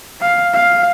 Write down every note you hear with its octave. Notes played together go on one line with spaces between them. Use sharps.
F5
F5